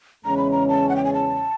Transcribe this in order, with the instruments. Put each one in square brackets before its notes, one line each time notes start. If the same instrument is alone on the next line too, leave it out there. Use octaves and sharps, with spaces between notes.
[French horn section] E2 C#3 E3 G#3 C#4 [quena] A#5
[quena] B5
A#5
A5
F#5
G5
G#5
A5